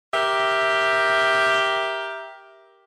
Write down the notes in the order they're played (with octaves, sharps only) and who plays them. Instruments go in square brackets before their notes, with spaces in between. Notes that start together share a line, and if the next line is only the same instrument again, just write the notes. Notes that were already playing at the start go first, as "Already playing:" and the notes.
[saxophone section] G4 A#4 E5